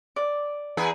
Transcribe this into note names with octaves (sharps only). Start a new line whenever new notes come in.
D5
E2 G#4 B4